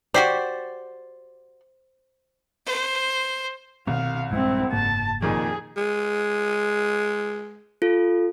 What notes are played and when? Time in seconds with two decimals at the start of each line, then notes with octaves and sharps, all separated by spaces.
0.14 F#4 G4 C5 D5
2.66 C5
3.87 C2 B2 D#3 C4 F5
4.31 A#1 G2 G#3 C4 E4
4.73 F#1 G#2 A#3 A5
5.22 F2 A#2 D#3 G#4
5.77 G#3
7.82 F4 A4